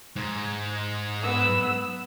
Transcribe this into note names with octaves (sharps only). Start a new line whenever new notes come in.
G#2
B3 E6